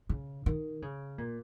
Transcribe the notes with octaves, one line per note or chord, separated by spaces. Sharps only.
C#3
D#3
C#3
A#2